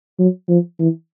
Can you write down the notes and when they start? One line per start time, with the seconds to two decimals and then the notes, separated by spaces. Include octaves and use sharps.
0.19 F#3
0.49 F3
0.79 E3